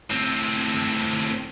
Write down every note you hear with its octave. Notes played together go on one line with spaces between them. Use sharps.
A2 C4